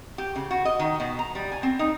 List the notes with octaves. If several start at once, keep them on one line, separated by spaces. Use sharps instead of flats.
G4
C#3
F#4
D#5
D#3
B2
A#5
G3
G#5
C4
D#4